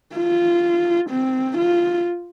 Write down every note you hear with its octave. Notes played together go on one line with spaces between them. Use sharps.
F4
C4
F4